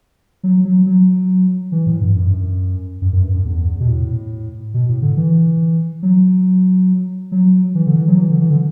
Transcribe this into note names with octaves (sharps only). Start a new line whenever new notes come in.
F#3
F#3
F#3
E3
A2
G2
F#2
F#2
F#2
G2
F#2
E2
B2
A2
B2
A2
D3
E3
F#3
F#3
E3
D3
E3
F#3
E3
D3
E3
D3